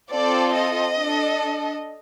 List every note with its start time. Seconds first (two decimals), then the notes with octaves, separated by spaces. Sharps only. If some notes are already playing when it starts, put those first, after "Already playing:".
0.11 C4 F4 A4 D5
0.56 D#5
0.98 D4 A4